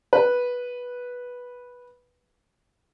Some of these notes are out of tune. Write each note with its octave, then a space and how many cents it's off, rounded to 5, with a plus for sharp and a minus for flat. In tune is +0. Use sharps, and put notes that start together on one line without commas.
B4 -10